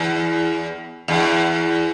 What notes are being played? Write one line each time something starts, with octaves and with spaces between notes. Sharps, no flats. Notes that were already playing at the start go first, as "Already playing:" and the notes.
Already playing: E2
E2